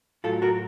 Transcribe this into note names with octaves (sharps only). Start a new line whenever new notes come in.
A2 F#3 F4 A4
F#4 A#4